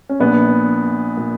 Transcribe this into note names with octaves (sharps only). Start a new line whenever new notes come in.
C#4
A#1 A#2 B3 D4
A#2